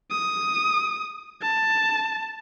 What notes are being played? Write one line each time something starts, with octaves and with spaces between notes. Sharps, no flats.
D#6
A5